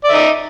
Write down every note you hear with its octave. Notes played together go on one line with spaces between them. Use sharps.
D#4 D5 E5